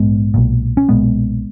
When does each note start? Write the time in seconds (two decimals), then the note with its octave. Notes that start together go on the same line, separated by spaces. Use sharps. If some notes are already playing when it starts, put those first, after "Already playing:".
Already playing: A#1 G#2 G#3 B3
0.34 B1 A#2
0.77 C#4
0.89 B1 A#2 G#3 B3